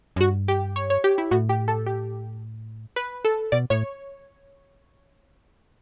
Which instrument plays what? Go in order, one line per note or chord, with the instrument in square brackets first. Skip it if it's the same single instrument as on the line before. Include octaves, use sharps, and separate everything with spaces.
[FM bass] F#2
[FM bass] G2 [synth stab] F#4
[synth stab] G4
C#5
C#5
G4
E4
[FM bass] A2 [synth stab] F#4
[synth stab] G4
A4
G4
B4
A4
[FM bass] B2 [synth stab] D5
[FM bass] A2 [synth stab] C#5